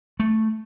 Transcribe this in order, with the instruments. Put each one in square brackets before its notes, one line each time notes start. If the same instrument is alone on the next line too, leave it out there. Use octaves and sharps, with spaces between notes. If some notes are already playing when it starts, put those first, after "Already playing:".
[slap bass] A3